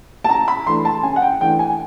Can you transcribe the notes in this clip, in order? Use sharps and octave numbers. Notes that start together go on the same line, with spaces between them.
A5
C#3 A#5
B5
E3 A3 D4 C6
A5
C#3 G#5
F#5
G5
E3 A3 D4 G5
G#5